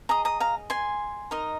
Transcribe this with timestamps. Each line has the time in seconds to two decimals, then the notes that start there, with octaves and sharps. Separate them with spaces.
0.09 G#4 D#5 A#5 D#6
0.25 A#5 D#6
0.40 F5 A#5
0.70 G#5 C6
1.31 D#4 A#4 D#5